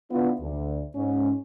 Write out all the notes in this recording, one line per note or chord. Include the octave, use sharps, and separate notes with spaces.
C#3 B3 D4 E4 F4 B4
D2
G#2 C#4